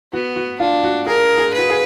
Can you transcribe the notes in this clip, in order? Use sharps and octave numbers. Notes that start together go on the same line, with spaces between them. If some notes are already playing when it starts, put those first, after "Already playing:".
B3 F#4
F#4
D4 F4
F#4
G#4 A#4
G#4
F#4 B4
G#4